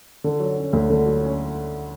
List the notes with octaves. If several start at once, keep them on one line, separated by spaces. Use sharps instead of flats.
D3
F#3
C#4
D2
D3
F#3
C#4